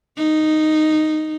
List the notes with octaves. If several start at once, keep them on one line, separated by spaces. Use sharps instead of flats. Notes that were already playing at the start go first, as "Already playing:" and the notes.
D#4